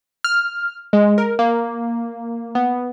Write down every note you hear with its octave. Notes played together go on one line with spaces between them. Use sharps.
F6
G#3
A#4
A#3
B3